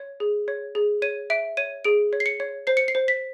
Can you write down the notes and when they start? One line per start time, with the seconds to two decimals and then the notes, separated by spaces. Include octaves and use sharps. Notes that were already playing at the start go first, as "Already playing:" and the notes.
Already playing: C#5
0.20 G#4
0.48 C#5
0.75 G#4
1.02 C#5 D#7
1.30 E5 D7
1.57 C#5 D#7
1.85 G#4 D7
2.13 C#5
2.20 C7
2.26 C#7
2.40 C#5
2.67 C5 C7
2.77 C#7
2.88 C7
2.95 C5
3.08 B6